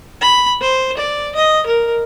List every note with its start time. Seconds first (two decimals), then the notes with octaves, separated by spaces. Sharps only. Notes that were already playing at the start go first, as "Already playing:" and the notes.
0.21 B5
0.61 C5
0.98 D5
1.35 D#5
1.67 A#4